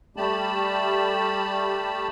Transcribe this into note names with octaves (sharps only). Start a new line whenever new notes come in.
G3 A3 G4 A5 B5